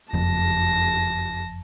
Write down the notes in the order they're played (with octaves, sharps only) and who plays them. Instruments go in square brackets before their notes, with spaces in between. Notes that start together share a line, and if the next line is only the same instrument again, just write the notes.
[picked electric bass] F#1 F2 [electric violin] A5 A#6